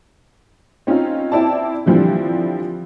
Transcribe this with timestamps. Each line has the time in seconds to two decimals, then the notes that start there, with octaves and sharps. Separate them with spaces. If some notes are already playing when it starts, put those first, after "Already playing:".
0.87 C4 C#4 D#4 F4
1.32 C4 E4 D5 A5
1.86 D3 E3 F3 G3 C4